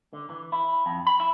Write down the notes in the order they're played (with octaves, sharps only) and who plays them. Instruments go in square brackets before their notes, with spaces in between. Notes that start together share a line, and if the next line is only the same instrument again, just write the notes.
[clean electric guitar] D3
E3
E4
F2
B5
E4